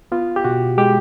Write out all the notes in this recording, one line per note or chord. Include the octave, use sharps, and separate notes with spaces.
B3 F4
G4
B2 F#4
G#3 G4